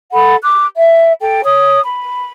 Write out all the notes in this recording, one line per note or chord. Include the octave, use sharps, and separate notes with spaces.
A4 F#5 B5
D6 F#6
E5
A4 G5
C#5 D#6
B5